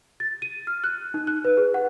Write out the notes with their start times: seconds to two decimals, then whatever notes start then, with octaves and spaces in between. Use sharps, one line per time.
0.20 A6
0.42 D#7
0.67 F6
0.84 F#6
1.14 D#4
1.27 F#6
1.45 B4
1.57 G#4
1.74 F#5